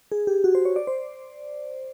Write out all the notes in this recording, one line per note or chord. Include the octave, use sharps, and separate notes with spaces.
G#4
G4
F#4
C5
C#5
D5
C5